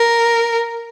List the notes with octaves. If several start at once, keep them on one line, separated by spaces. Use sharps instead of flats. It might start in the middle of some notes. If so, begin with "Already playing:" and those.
Already playing: A#4